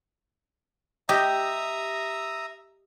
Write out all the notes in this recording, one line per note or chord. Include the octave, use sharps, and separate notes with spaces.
G4 D#5 E5 A#5 D#6